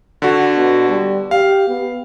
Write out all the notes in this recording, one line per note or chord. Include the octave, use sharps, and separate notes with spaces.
D3 F#4
B2
G3
G4 F5
B3